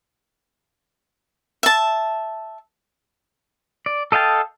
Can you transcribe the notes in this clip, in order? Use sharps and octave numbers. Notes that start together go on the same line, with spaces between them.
E5 A5
D5
A4 D#5 F5 G5 A5